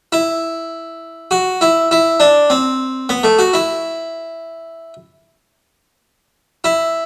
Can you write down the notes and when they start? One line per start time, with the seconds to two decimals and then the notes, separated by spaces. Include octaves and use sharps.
0.12 E4
1.31 F#4
1.61 E4
1.91 E4
2.20 D4
2.50 C4
3.09 B3
3.24 A3
3.39 F#4
3.54 E4
6.64 E4